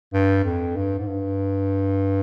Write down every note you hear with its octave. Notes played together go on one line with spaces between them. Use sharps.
G2
F2
G2
G#2
G2